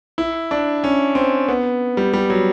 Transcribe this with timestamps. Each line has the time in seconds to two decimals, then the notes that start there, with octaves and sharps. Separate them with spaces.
0.18 E4
0.51 D4
0.84 C#4
1.15 C4
1.48 B3
1.97 G3
2.13 G3
2.30 F#3